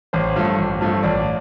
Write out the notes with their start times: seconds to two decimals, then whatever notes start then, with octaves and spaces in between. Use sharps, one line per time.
0.13 A1 C5
0.36 G2 F3 A3
0.58 A1
0.81 G2 F3 A3
1.03 A1 D5